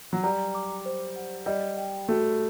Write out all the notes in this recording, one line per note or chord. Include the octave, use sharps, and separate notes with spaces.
F#3
G3 A#5
D6
C5
F#5
G3 D#5
G5
A3 F#4